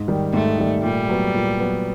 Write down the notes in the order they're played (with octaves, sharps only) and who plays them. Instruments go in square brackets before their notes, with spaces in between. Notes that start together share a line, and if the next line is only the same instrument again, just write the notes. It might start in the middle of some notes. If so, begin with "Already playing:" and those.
Already playing: [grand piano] G#2
D#3 G3
[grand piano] G#2 [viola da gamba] A3
[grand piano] D#3 G3
[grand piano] A#2 [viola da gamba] G3
[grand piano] F#3 B3
A#2
F#3 B3